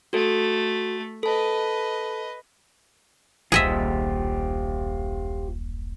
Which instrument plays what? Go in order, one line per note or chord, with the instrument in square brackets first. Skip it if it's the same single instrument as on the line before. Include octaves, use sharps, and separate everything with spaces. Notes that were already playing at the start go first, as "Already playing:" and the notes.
[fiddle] A3 [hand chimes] F#4 A4
[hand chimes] A4 A5 [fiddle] B4 D#5
[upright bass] D#1 B1 [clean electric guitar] F4 G4 C5 [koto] G#4 D#5 E5